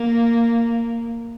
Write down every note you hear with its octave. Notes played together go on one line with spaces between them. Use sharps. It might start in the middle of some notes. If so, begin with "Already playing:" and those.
Already playing: A#3